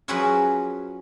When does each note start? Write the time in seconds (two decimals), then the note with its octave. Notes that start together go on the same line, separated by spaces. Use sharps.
0.08 F3 F#3 C#4 G#4 A#4 B4